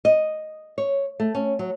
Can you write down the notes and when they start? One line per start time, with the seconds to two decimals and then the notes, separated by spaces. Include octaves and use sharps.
0.05 D#5
0.78 C#5
1.20 A3
1.35 C#4
1.59 F#3